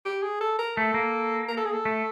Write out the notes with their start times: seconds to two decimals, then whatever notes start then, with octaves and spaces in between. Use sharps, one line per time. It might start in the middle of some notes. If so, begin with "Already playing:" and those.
0.05 G4
0.23 G#4
0.41 A4
0.59 A#4
0.77 A3 A4
0.94 A#3
1.49 A#4
1.57 A4
1.65 G#4
1.73 A4
1.85 A3